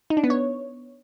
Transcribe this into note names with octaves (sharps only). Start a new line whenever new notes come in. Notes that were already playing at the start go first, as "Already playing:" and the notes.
D#4
D4
B3
C#5